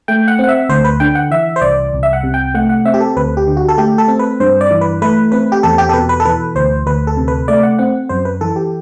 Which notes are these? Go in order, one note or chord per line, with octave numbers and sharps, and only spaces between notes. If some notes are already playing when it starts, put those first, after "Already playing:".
A3 G5
F#5
C4 F#5
E5
D2 C5
B4
D3 G5
F#5
E3 E5
C5
C2 D5
C2
E5
F#5
C3
G5
A3 F#5
F#5
C4 E5
G4
A4
D2 B4
G4
D3
F#4
A4
A3 G4
A4
C4
B4
G2 C5
D5
E3
B4
A3 B4
C4 B4
G4
E2 A4
G4
A4
B2 B4
B4
A4
E3 B4
D2 C5
D2 B4
A4
C3
B4
A3 D5
F#5
C4 F#5
F#2 C5
B4
E3 A4
G4